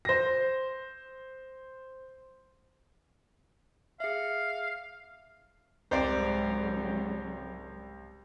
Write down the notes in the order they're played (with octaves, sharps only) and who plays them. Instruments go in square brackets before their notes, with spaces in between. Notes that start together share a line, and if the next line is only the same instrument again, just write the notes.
[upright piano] C5 A#6
[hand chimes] G#4 E5 [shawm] F5
[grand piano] C2 [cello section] G#2 C#3 F#3 [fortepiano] C5 D5